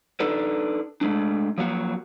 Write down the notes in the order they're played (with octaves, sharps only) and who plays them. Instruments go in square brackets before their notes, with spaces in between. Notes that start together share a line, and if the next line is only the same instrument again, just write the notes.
[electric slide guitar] D4 D#4 A4 B4
G#3 A3 D4
F3 F#3 A#3 F#4